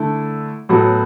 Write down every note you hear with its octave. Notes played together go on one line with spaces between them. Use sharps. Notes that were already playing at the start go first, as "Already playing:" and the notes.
Already playing: D3 A3 E4 A4
A2 F#3 B3 F#4 A4